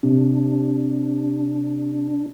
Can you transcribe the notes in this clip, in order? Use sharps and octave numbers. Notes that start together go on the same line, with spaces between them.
C3 D4